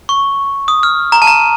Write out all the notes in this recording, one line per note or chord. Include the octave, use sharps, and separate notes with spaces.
C#6
D#6
F6
A#5
A5
A#5